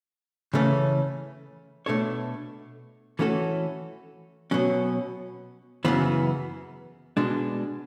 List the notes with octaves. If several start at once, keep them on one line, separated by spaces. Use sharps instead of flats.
C#3 E3 A3 C#4
B2 A3 D4 A4 C#5
E3 A3 C#4 F#4 A4
B2 F#3 C#4
F#2 C#3 E3 B3
B2 G#3 D4